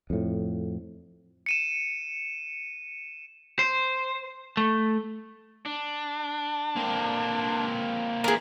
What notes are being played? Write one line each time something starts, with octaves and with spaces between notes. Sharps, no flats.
F2 A2
C#7 D#7 E7
C5
A3
D4
A#3 C4
A#2 E3 G#4 A#4